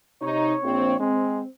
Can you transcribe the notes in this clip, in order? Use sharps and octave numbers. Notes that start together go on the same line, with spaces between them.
C3 D#4 C#5
A#1 C4
G#3 C4